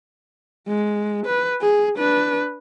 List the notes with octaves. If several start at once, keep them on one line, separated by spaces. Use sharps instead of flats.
G#3
B4
G#4
D4 B4